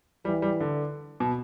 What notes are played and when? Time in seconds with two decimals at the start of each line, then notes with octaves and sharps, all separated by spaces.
0.25 E3 G3
0.42 G3
0.60 D3
1.20 B2